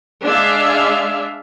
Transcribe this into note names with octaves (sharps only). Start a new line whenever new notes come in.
G#3 D4 G#4 E5 F5